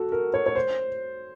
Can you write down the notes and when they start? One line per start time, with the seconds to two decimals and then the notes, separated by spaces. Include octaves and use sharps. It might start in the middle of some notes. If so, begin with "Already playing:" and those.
Already playing: F#4 A4
0.12 A#4
0.34 C#5
0.46 C#5
0.56 C5